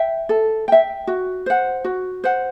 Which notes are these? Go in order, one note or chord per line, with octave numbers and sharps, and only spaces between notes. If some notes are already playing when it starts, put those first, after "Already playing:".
Already playing: E5 G5
A4
E5 G5
F#4
C5 F#5
F#4
C5 F#5